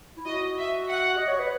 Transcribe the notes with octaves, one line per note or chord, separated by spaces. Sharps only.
E4
F#4 D#5
E5
F#5
D#5
C#5
B4